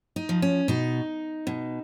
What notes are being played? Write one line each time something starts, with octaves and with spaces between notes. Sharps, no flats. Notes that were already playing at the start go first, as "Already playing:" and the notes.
D#4
F3
C#4
B2 D#4
B2